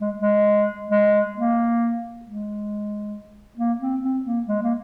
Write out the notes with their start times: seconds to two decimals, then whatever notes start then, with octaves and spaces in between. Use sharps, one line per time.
0.01 G#3
0.20 G#3
0.90 G#3
1.36 A#3
2.25 G#3
3.58 A#3
3.80 C4
4.03 C4
4.25 A#3
4.48 G#3
4.63 A#3